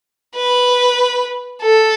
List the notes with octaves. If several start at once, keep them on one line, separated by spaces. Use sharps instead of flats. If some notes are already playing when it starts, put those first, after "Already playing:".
B4
A4